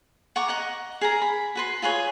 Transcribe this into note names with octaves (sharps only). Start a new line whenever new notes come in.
F#5 A#5 C#6 D6
D#5 F#5 A#5
G#4 A#4 A#5
B5
F#4 B4 C6
F4 G#4 B4 C#5